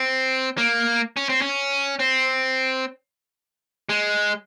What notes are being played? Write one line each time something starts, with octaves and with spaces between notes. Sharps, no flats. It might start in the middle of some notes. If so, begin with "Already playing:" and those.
Already playing: C4
A#3
C#4
C4
C#4
C4
G#3